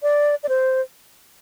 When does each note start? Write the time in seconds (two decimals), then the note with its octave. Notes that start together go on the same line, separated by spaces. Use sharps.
0.03 D5
0.43 D5
0.49 C5